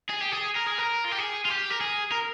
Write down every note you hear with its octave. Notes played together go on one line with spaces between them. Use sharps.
G#4
G4
G#4
A#4
G#4
A#4
F4
G4
G#4
F4
G4
A#4
G#4
A#4